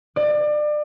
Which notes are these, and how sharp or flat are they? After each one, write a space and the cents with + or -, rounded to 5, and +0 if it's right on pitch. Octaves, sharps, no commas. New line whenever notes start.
D5 +30